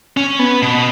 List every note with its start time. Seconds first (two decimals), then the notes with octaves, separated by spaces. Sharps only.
0.17 C#4
0.39 B3
0.62 B2